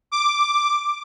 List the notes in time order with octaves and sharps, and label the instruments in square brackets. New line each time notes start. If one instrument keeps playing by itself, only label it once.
[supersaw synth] D6